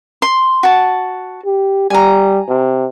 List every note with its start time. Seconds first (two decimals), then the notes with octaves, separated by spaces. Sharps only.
0.22 C6
0.63 F#4 A5
1.45 G4
1.90 G3 G#5 A#5
2.49 C3